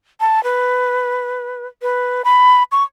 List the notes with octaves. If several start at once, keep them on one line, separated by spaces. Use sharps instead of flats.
A5
B4
B4
B5
C#6